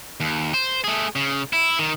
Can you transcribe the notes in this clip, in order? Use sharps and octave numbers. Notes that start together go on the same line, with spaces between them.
D#2
C5
A3 G#4
C#3
E4
D#3